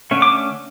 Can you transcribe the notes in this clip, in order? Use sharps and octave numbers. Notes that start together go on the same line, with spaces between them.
D3 A3 C#4
D6